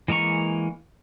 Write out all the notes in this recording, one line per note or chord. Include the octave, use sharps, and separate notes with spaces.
E3 G#3 A#3 A#5 C#6